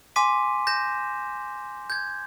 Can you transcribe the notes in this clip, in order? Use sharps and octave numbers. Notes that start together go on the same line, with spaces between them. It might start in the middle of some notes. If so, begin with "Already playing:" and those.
G#5 C6 D6 B6 D#7
G6 A#6 E7
G6 G#6